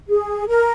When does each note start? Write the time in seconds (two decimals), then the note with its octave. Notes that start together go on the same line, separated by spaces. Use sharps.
0.08 G#4
0.47 A#4